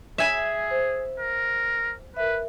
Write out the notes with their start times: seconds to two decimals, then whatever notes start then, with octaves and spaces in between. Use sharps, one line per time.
0.18 G#4 E5 G#5 B5
0.71 C5
1.20 A#4
2.17 A#4 B4 E5